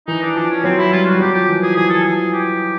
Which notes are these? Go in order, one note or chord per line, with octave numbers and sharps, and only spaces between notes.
E3 D#4
D4
F3 D4
C#4
F#3 C4
E4
G3 F4
G3 F#4
F#3 G4
F3 G4
E3
F3 G#4
E3 G#4
A4
G#4
G4